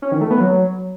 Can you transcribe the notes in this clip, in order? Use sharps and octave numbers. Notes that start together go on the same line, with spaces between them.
C#4
D#3
A3
B3
F#3